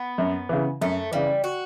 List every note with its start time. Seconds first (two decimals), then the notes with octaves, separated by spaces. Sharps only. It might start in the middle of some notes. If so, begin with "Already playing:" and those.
Already playing: B3
0.18 F#2
0.49 C#3 E3
0.81 F#2 A3
1.12 C#3 E3 G3
1.44 F#4